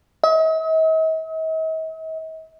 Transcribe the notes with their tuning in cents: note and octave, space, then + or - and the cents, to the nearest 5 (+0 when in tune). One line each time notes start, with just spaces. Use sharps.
D#5 +45